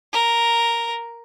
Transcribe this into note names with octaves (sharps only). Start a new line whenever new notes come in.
A#4